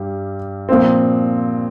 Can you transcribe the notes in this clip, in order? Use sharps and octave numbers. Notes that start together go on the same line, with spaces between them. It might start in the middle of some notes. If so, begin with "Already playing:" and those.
Already playing: G2 G3
A#2 F3 C4